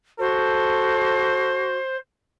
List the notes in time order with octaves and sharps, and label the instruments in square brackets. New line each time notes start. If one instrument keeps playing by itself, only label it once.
[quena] F#4 [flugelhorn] A4 [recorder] C5